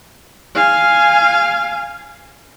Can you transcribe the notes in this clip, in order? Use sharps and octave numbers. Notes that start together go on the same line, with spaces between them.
F5 G#5